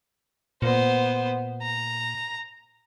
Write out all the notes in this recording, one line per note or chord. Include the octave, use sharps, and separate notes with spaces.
A#2 B3 C5
A#5